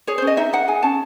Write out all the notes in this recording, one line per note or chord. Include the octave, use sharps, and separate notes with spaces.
G#4 C#5
C5
C#4
D#5
D#4 E5
D#4 F#5
G#4 G#5
C#4 A5